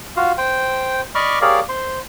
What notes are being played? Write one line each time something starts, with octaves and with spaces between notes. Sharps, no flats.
F4 F#4 F5
C5 G5
D5 D#5 B5 C#6 D6 F6
G4 G#4 A#4 C#5 D5 F5
C5 C6